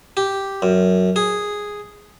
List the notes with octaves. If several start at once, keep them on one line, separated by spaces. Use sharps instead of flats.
G4
F#2
G#4